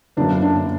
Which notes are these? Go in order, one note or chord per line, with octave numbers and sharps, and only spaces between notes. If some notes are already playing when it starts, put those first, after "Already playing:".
G1 F#2 D3 A#3 D4
D4